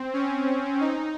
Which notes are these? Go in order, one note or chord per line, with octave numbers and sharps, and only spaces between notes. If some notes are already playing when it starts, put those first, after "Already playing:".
Already playing: C4
C#4
D#4